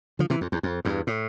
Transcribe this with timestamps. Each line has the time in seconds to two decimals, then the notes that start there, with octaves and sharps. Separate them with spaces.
0.19 D3 F3
0.30 C3 E3
0.41 F2
0.52 E2
0.63 F2
0.85 E2 G2
1.07 A2